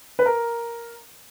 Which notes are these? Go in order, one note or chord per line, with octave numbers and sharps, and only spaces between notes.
B4
A#4